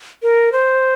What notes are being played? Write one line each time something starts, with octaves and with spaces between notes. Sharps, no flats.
A#4
C5